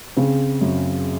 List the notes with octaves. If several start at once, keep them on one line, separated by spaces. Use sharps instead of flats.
C#3 C4
F#2